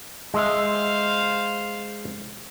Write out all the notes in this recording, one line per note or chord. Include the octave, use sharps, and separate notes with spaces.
G#3 C5 E5 F5